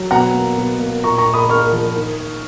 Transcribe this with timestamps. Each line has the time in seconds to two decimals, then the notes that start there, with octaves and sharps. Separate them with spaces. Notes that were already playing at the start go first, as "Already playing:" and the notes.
Already playing: F#3
0.11 B2 F#5 A#5
0.34 A#3
0.57 B2
0.80 A#3
1.04 A#2 A#5 C#6
1.18 A#5 C#6
1.26 A#2
1.34 B5 D#6
1.49 A#3 C#6 F6
1.73 F3
1.96 D#3